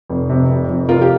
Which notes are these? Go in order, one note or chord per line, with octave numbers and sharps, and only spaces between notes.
F1
C3
F1
F2
F1 F4 A#4
G4